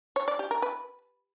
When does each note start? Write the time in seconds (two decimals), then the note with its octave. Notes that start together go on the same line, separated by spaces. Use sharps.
0.16 C#5
0.28 D5
0.39 G4
0.51 A#4
0.62 B4